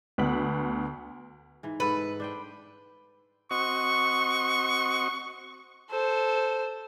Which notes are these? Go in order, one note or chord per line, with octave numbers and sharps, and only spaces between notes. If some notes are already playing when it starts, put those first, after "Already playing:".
D2 B3 F#5 B6 F#7
G#2 E3
G#2 A4 B4
D4 C5 G5
C4 F#4 D#5 C#6
A4 C5